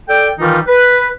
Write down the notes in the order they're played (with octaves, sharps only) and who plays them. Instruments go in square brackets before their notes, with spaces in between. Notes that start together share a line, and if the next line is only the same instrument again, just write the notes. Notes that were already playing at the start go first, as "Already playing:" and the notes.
[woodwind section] A4 D5 G5
D#3 E3 G3 D#4 F4
B4